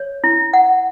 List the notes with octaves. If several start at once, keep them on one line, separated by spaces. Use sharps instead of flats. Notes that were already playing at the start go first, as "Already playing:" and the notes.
Already playing: C#5
E4
F#5